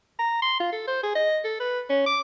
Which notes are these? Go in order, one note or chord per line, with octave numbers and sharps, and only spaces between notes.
A#5
C6
F4
A4
C5
G#4
D#5
A4
B4
C#4
D6